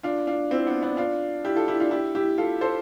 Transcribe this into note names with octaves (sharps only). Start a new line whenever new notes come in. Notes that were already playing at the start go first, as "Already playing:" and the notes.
D4 F4
D4 F4
C4 E4
B3 D4
B3 D4
D4 F4
E4 G4
F4 A4
E4 G4
D4 F4
E4 G4
E4 G4
F4 A4
A4 C5